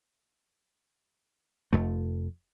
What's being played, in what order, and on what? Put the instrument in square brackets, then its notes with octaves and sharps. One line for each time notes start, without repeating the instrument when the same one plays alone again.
[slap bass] F1 F2 A3